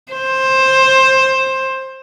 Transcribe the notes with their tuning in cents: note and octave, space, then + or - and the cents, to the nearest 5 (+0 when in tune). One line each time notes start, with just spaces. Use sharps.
C5 +15